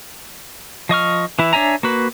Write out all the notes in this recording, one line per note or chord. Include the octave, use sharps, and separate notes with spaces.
F3 D#5 C#6 F6
E3 E4
D4 C#5 E5 G#5 A#5
A#3 F#4 B4